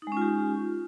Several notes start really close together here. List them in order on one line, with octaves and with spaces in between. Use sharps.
D#4 G#3 C#4 F4 G4